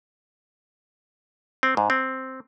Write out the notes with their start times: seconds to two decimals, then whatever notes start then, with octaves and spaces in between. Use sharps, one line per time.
1.63 C4
1.77 G#2
1.90 C4